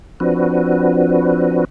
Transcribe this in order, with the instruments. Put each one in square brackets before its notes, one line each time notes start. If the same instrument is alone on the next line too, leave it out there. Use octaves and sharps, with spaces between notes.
[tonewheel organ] F3 C4 D4 F#4 B4